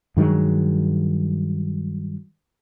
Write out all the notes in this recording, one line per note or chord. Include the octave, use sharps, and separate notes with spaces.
G2 D#3 F#3 G#3